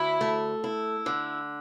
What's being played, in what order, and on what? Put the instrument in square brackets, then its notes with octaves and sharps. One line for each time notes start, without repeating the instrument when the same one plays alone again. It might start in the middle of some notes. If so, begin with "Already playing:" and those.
Already playing: [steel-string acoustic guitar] D2 [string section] E4
[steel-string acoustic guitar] A3
E4
D3